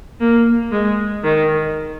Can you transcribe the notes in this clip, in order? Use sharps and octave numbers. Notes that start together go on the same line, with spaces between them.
A#3
G#3
D#3